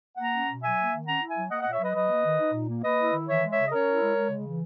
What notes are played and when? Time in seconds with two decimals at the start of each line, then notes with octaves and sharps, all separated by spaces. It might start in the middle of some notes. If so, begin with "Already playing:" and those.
0.17 A#3 F#5 A#5
0.32 C#4
0.47 B2
0.61 F#3 E5 G#5
0.76 A#3
0.91 D#3
1.06 C#4 F#5 A#5
1.21 E4
1.27 E5 G#5
1.35 F#3
1.49 A#3 D#5 F#5
1.61 D#5 F#5
1.65 A#2
1.72 C#5 E5
1.80 F#3 B4 D#5
1.94 F#3 B4 D#5
2.09 A#3
2.24 D#3
2.39 D#4
2.53 A#2
2.68 A#3
2.82 A#3 B4 D#5
2.98 E4
3.12 D#3
3.27 E3 C#5 E5
3.41 G#3
3.49 C#5 E5
3.56 C#3
3.67 D#5
3.71 C#4 A#4 C#5
3.87 E4
4.00 G#3
4.15 G#3
4.30 C#3
4.46 E3